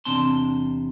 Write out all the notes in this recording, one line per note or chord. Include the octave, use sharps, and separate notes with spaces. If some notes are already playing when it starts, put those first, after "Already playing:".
E2 C3 C4 D4 A5 C6